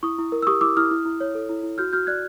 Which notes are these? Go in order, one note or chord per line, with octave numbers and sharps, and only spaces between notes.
E4 C#6 D#6
E4
A#4
E6
G4 C#6 D#6
E4 D6 E6
E4 D#6 F6
E4
E4
C#5
A4
E4
E4
F#4 F6 G6
F#4 F6 G6
D5 F#6 G#6